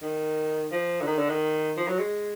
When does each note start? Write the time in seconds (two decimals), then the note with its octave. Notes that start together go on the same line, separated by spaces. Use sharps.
0.02 D#3
0.71 F3
1.01 D3
1.06 D#3
1.18 D3
1.29 D#3
1.77 F3
1.88 F#3
1.99 G#3